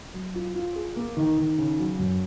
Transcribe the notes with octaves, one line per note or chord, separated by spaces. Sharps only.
F#3
F4
F4
G#4
A#3
D#3
D#3
C#3
F#3
F#2